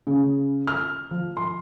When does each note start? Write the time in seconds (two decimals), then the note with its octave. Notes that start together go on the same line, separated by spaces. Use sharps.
0.07 C#3
0.67 F6
1.11 F3
1.37 C6